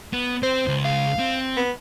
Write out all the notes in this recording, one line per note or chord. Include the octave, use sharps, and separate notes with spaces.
B3
C4 C5
C#2
F5
C4
B3